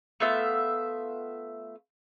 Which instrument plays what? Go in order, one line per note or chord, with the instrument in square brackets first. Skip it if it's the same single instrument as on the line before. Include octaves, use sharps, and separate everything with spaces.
[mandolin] A3 B3 F4 E5